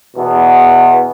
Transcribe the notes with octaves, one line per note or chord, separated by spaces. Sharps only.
E2 B2 B3